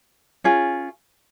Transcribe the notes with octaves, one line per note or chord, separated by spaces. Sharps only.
C#4 F4 G#4